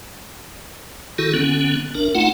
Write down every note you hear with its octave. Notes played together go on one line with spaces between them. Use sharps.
D#3 E4 F#4 A4
D3 B3 C#4
A1 D4 A#4
A3 D#4 F4 F#5